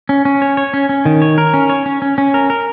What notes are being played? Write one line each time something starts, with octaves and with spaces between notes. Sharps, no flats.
C#4
C#4
C#5
C#5
C#4
C#4
D#3
C#5
A#4
C#4
C#5
C#4
C#4
C#4
A#4
A#4